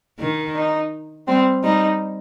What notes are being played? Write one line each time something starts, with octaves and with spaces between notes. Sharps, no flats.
D#3
D#4
G3 C4
G3 D#4